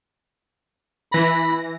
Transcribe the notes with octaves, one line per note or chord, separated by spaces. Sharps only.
E3 B5 A#6